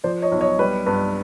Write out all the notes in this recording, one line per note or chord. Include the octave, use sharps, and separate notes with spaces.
F3 C5 D5
C#5 D#5
B1
C#5 D#5
G3 B4
G2 B4